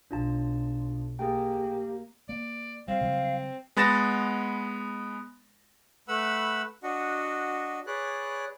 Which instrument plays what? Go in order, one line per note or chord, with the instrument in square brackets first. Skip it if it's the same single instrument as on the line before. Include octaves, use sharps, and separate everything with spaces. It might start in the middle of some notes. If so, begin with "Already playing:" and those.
[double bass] B1 [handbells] D4 F4 A5
[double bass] A#3 [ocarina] G4 [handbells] G#4 G5
[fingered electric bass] A#3 [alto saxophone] D5
[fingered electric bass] G3 [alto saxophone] C4 [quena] F5
[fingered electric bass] C#3 F#3 G3
[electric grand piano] G#3 B3 B5 A6 A#6 E7
[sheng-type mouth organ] A3 B4 F#5 B5 E6
D4 F#4 D#5 F#5
G#4 B4 C#5 D5 F#6